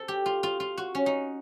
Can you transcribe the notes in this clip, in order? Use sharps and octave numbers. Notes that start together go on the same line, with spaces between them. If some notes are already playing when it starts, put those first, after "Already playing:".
Already playing: A4 C5
G4
F4
F4
F4
F#4
C#4
D#4